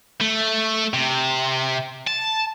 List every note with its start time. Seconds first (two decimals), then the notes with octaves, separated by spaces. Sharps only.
0.21 A3
0.94 C3
2.07 A5